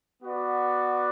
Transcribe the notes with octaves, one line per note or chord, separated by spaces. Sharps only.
B3 F#4 B4 D5 F#5